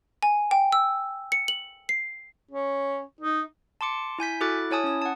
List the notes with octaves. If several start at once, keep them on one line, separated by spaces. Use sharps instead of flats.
G#5
G5
E6
C#7
F#7
C7
C#4
D#4
A5 C6 D6 C#7
E4 G#5 G6 B6
E4 F#4 A4 D6 F#6 A6
E4 C#5 G#5 A5 D#6
C#4 D#6
F#5 A5